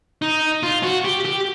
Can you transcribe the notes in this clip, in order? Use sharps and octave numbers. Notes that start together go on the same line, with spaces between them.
D#4
F4
F#4
G4
G4